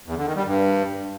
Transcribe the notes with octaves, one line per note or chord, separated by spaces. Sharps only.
E2
D3
D#3
G3
G2